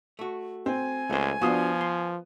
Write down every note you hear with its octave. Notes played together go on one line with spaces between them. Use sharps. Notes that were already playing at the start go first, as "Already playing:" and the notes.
A3 F#4
C4 G#5
C#2 A3 C5
F3 B3 D4 F4 F#4 D#6
C6